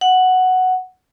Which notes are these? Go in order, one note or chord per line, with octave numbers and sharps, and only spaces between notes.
F#5